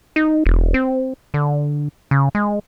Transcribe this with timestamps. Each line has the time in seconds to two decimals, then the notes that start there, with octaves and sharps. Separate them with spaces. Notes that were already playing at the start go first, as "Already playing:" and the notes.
0.16 D#4
0.46 E1
0.74 C4
1.34 D3
2.11 C#3
2.35 G#3